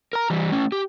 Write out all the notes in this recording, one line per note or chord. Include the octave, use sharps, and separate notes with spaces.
A#4 A#5
E3 G3
A3 C#4
G4